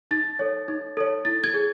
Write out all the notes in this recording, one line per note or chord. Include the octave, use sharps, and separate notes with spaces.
D#4 A6
A4 C#5
D#4
A4 C#5
E4 A6
G#6
G#4